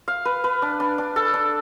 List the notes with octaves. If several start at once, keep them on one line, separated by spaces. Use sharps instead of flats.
F5
B4
B4
D4
D4
D4
A4
D4